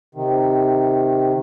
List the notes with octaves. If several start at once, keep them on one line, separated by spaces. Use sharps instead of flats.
C3 D#3